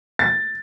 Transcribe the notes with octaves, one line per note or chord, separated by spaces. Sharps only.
A6